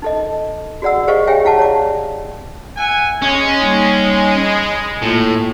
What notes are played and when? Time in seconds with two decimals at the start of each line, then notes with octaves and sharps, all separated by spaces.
0.02 D#4 A4 D#5
0.82 F#4 G#4 D5 F#5 E6
1.08 G4 G#4 C5 D#5 F5 C#6
1.27 G4 G#4 C#5 E5 G5 G#5
1.45 E4 G#4 F5 F#5 A5 D6
1.59 C#5 D5 D6
2.77 E5 F#5 G#5
3.22 G#3 C#4
3.60 G3 A#3 D#4
4.40 B5
5.02 A2 A#3 F4